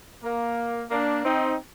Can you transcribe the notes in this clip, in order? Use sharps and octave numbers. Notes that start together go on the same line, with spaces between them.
A#3
A#3 D4
C4 D#4